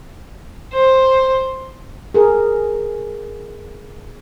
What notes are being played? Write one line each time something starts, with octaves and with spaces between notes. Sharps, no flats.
C5
G#4 A#4